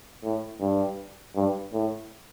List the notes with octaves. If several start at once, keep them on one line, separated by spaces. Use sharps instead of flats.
A2
G2
G2
A2